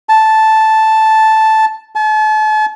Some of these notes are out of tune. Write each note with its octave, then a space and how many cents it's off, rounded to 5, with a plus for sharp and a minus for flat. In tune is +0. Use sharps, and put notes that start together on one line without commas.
A5 -5
A5 -40